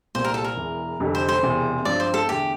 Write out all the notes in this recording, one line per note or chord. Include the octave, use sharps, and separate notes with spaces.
C2 A#2 G3 C4 G4 C5
A#4
A4
A#4
E1 E2 E3
F1 F2 D3 G3
C5
C5
E1 E2 C3
G2 F3 C4 D5
C5
A4
E2 D3 A3 G4